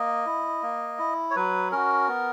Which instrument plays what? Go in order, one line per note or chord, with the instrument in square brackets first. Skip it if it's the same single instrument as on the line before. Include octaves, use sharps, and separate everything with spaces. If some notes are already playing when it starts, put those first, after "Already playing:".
Already playing: [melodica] A#3 D#5
E4
A#3
E4
C#5
F#3 B4
C#4 F#4 A#4
B3